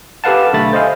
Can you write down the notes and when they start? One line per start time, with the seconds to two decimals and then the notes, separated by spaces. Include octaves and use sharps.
0.24 G4 A4 B4 F5 F#5 A5
0.53 B1 D3 A3 B5 A6
0.73 C5 D#5 F5 G#5